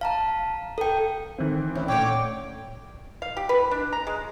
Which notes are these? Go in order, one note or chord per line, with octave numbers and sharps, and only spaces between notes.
F5 A5 A#5
A4 G5
D#3 E3 C4
D2 C#4 E4
A#2 D3 C#5 G5 D6
F5
G4
B4
D4
A#5
G#3